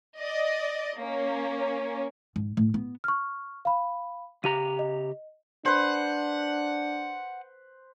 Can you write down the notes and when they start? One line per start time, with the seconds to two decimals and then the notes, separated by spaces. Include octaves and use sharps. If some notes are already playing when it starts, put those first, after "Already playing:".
0.17 D5 D#5
0.99 A#3 C#4
2.36 G#2
2.57 A2
2.74 B3
3.04 C#6 F6
3.65 F5 B5
4.44 C#3 G4 A#5 D#7
4.79 D#5
5.65 D4 B4 C5 F#5